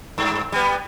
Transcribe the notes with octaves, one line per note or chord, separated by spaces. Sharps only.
G2
G3 B3